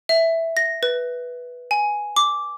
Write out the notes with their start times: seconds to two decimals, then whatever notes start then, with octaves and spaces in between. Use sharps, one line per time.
0.09 E5
0.57 A#6
0.83 B4
1.71 G#5
2.17 D6